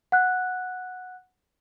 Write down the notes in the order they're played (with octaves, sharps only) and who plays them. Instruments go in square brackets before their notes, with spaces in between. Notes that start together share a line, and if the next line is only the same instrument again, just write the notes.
[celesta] F#5 F#6